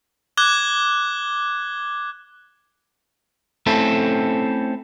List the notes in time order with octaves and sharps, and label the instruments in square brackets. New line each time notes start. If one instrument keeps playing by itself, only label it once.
[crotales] D6 F#6 G#6 G7
[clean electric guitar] A3 C4 C#4 E4 A4